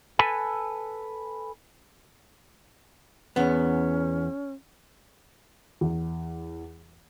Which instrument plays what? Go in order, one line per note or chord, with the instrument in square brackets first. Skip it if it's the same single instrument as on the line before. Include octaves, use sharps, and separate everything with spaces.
[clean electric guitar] A4 B4 G#5
[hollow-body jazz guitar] E2 B3 [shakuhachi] C#4
[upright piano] E2